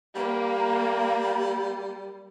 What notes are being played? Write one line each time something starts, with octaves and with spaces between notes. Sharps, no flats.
G3 A#3